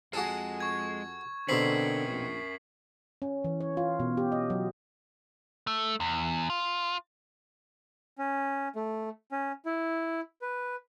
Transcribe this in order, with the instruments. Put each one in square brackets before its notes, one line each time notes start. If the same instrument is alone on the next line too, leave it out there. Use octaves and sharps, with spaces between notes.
[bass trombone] F2 [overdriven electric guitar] G#3 [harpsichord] F#4 G#4 A4
[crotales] C#6 G#6
[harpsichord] B2 C4 [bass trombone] D3 [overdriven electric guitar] C#4 A#4 [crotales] B6 C7 F#7
[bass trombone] A#1
[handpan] C#4
E3
C#5
F4
B2
G4
D#5
F#3
[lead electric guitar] A3
E2
F4
[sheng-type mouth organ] C#4
A3
C#4
E4
B4